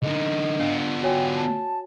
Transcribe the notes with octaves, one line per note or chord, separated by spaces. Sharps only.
D3 D#4 D#5
B3 D4 F4
F#4 C#5 G5 G#5
A5